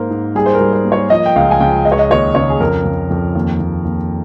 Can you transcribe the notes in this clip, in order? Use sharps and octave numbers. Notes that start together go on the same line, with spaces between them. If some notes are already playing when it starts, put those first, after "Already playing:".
Already playing: G#2 A#3 A#4 C5
G#2
G3 G#4
C5
A#4
G3
C5
A#3
C#5
F3 D#5
G5
C#2 F5
G#5
C#2 G5
G#3 D#5
C#5
D#5
D#2 C#5
C#3 C#5
G#4
F2 A#4
F2
F2
D#2
D#2
D#2